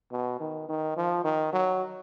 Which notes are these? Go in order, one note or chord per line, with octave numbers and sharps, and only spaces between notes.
B2
D#3
D#3
F3
D#3
F#3